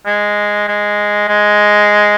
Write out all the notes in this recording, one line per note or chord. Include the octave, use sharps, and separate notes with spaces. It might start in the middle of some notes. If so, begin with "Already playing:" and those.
G#3
G#3
G#3